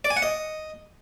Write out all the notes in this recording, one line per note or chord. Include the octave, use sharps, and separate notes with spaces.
D5
G#5
F#5
D#5